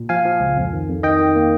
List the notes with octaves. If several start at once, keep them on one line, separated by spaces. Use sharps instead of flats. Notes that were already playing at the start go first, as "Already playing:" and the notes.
Already playing: A#2
F3 F5 G#5
F3
C#2
F2
D#3
F2
D#3 D#5 G5
D#3
A#3